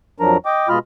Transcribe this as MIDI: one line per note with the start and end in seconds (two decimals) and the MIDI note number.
0.20 0.37 41
0.20 0.37 53
0.20 0.37 54
0.20 0.37 62
0.20 0.37 70
0.20 0.37 82
0.46 0.69 75
0.46 0.69 79
0.46 0.69 86
0.69 0.79 47
0.69 0.79 56
0.69 0.79 65
0.69 0.79 75
0.69 0.79 83
0.69 0.79 89